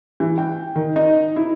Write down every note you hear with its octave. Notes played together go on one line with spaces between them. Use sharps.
E3
G5
D#3
D#4
E4